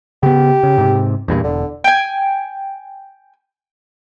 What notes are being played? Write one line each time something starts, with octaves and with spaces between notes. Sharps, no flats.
C#3 B3 G4
C#3
G#2 C3
E2 G2 A#2
E1 D3
G5 G#5